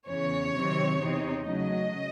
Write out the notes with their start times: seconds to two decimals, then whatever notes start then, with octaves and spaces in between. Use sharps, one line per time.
0.08 E2 C#3 E3 C#5
0.55 C3 D#3 F#3 C4
1.01 E2 C3 E3 C4 D#4
1.47 C#3 F#3 A3 D#5